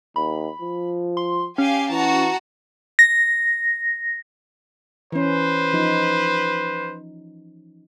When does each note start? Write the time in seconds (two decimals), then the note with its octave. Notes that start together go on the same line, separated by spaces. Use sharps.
0.16 D#2 B5
0.62 F3
1.17 C6
1.58 C#4 G4 F5 G#5
1.91 E3 F#4 A5 A#5
2.99 A#6
5.12 E3 C#4 B4 C5
5.73 F3 D#4